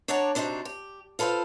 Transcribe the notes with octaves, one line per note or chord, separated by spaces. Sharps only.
D4 C#5 D5 F#5 A5 A#5
C3 D4 D#4 F#4 C5
G4
F4 A4 B4 C5 F5